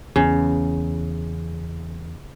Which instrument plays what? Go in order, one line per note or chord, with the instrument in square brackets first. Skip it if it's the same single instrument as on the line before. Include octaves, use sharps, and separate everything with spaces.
[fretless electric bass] E2 [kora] C#3